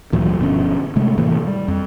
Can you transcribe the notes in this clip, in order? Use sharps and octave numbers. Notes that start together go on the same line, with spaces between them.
D2 A#2 E3 F#3
G1 B2 F3 C#4
C3 G#3 A3
A2 C3 E3 A#3
G3
F2